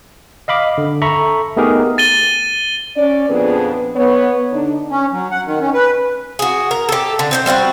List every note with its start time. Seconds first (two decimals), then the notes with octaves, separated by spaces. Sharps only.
0.48 D#5 F5 B5 D6
0.78 D3
1.02 A4 E5 A#5 B5 C#6
1.57 A3 B3 D#4 G4 G#4 A#4
1.98 A6 D#7 G7
2.96 C#4 D5
3.29 F2 A#2 B3 D4 G#4 B4
3.96 B3 C#5
4.52 D3 D4 D#4
4.91 C#4
5.12 F#3
5.31 F#5
5.46 D#3
5.61 C#4
5.74 B4
6.39 F#4 G#4
6.71 A#4
6.89 G4 A4
7.19 D3
7.31 C4 D4 C5
7.46 G3 C4 F4 F#4